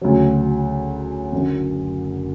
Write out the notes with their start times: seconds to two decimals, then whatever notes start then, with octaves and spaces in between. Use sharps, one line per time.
0.01 D2 C#3 F#3
1.32 F#1 F#2 D3